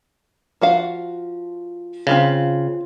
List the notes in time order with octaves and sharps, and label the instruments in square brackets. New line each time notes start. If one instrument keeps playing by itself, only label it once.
[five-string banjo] F3 F#4 F5
[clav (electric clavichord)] C#3 [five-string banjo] C4 F4 F5